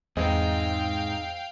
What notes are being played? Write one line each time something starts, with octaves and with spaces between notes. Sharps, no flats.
E2 G#2 C4 G#4 D#5 F5 G5